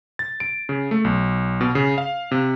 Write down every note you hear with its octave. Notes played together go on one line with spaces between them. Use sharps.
A6
D7
C#3
A3
B1
B2
C#3
F5
C3